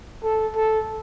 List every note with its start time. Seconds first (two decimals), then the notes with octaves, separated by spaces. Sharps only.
0.24 A4
0.56 A4